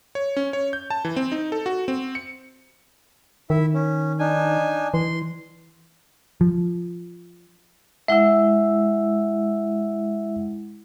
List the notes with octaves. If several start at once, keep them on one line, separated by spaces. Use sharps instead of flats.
C#5
C#4
C#5
G6
A5
E3
C4
D#4
A4
F#4
C4
C#7
D#3 E4 E5
C#4
D4 D#4 G#5
E3 C6
F3
G#3 E4 E5 F#5 E6